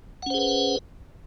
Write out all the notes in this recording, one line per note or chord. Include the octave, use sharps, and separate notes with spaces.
C#4 G#4 B4 C5 F#5